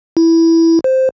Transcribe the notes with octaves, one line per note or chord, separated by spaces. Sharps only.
E4
C5